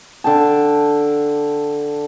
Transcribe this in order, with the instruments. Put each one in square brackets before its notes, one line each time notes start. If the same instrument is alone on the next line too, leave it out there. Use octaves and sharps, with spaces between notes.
[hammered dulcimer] D3 G5 A5